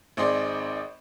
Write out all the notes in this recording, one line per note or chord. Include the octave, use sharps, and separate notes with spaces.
G#1 C4 D#4 G#4 D5 C6